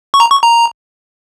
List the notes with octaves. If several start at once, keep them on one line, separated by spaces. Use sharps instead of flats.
C#6
A#5
C#6
A#5